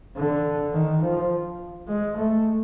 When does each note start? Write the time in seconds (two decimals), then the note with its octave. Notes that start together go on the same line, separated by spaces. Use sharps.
0.17 D3
0.73 D#3
1.03 F3
1.88 G#3
2.17 A3